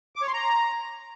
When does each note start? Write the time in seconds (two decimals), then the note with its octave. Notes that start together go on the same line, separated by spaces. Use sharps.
0.16 D6
0.22 C#5
0.28 C6
0.34 A#5